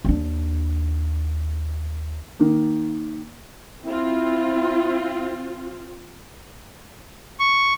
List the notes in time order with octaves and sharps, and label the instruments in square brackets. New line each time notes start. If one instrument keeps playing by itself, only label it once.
[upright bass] D#2 D4
[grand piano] D#3 A#3
[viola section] C4 F4 [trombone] E4
[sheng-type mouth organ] C#6